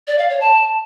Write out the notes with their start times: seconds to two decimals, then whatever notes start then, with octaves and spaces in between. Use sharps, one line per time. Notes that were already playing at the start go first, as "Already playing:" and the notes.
0.07 D5
0.18 F5
0.29 C#5
0.40 A5